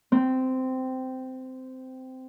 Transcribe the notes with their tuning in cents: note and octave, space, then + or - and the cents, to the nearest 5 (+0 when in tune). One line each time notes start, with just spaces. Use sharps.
C4 -15